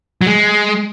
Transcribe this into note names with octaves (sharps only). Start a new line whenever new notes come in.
F#3
G#3